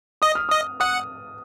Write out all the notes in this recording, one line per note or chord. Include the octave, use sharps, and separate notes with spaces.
D#5 D#6
F6
D#5 D#6
F#5 D#6